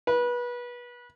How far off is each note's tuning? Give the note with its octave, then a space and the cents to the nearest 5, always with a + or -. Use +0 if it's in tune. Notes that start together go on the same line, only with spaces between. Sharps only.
B4 -25